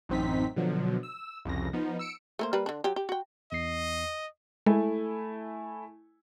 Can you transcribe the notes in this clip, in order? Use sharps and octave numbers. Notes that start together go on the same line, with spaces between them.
A1 F#2 C4 D#4 B6
B2 D3 F3 F#3
E6
C2 F2 C#3 A#6
F3 B3 D#4
E6 C#7 D7
A3 A#3 C5
G3 A#3 B4
D3 D4
F#3 G4
G4
F#4 G5
E2 D#5 C7
G#3 A3 E4 G#5